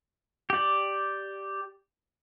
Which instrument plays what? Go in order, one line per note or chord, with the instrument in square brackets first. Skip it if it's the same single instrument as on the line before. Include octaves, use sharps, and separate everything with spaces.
[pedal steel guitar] G4 D5